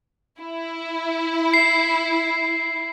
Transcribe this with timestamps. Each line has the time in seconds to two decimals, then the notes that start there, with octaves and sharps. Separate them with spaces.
0.40 E4
1.54 C7